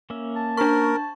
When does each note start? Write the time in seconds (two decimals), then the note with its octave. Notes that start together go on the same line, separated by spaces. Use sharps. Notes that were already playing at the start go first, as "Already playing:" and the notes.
0.10 A#3 C#4 E5
0.36 A5
0.57 D4 A#4 C#6